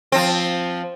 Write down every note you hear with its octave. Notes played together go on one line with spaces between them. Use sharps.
F3 C4